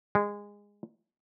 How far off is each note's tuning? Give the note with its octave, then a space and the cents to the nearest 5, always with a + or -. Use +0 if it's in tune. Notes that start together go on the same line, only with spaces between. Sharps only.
G#3 -20